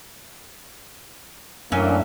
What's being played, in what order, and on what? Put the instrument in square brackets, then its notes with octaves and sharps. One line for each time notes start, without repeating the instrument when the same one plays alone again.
[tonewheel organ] F#2 E5 [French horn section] A2 A#3 D4 [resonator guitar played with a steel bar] E3 C#4 G#5